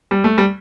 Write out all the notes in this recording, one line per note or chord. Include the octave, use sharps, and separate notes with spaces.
G3
A3
G3